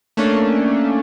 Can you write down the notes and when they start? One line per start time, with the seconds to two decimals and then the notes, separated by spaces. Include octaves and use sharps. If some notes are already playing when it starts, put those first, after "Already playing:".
0.17 A3 A#3 C#4 D4